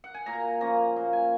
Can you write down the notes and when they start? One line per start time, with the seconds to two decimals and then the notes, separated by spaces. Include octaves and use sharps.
0.04 F#5
0.14 G#5
0.26 A#2 A#5
0.61 F3 A#3 C#4 A#5
0.96 A#2
1.13 G#5